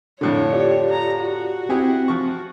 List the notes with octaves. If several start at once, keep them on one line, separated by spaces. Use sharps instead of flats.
F2 A2 D3 D4 C#5
F4 G4 D5
A#5
F#4
C4 E4 G4 G#4
F3 C#6